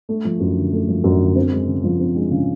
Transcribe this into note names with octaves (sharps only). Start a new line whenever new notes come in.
A3
F3
F#2
D3
A3
F3
F#2
D3
C4
G#3
C#3
F3
C4
G#3
C#3